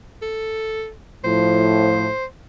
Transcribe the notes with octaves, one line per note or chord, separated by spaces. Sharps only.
A4
A2 F3 C5